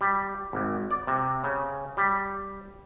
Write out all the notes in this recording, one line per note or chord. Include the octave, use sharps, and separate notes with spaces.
G3
G#1
D5
C3
C#3
G3